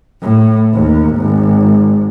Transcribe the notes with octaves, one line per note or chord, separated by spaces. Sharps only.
A2
D#2
G#1